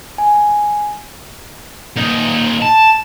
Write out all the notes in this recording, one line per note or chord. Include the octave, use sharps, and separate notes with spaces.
G#5
A#2 D#4
A5